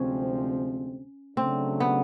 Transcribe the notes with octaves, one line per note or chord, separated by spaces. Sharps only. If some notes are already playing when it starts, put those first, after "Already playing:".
Already playing: D2 C3 F3 G#3 C4 C#4
C#3 F#3 A3 C4 D4
B3